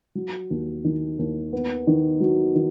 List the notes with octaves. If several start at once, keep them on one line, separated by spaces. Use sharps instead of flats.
F#3
D#2
D#3
D#2
B3
D#3
F#3
D#3